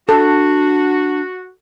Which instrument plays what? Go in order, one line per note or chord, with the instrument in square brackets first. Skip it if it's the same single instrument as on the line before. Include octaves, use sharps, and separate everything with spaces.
[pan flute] D4 [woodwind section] F#4 [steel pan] A4